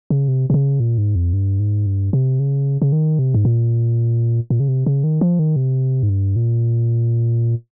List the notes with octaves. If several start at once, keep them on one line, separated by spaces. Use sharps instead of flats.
C#3
C3
C3
C#3
A#2
G#2
F2
G2
G#2
G2
C3
C#3
C#3
D#3
C3
G#2
A#2
A#2
C#3
C3
C#3
D#3
F3
D#3
C3
G#2
G2
A#2